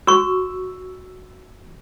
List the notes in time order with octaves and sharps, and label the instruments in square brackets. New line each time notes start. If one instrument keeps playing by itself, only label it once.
[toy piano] F#4 C#6 [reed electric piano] E6